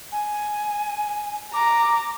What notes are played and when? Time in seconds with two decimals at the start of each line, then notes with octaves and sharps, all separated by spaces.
0.12 G#5
1.54 A#5 D6